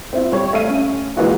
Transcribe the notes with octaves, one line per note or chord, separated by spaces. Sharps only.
C4 E4 F4
G3 C#5
A3 E5 F5 D#7
C#4
E3 G#3 A#3 F4 F#4